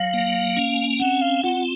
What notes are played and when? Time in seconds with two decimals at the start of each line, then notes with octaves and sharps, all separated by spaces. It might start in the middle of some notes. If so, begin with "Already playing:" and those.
Already playing: F#3 F5
0.14 A#3
0.57 C#4
1.00 C4 F#5
1.22 F5
1.43 F4 F#5